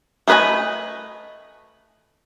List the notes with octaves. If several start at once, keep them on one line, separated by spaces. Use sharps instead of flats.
A3 G#4 B4 D#5 G#5